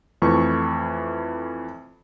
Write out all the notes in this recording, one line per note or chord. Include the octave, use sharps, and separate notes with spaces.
F2 E3 A3 C#6